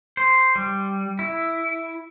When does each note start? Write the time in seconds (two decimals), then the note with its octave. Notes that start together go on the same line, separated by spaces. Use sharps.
0.17 C5
0.56 G3
1.19 E4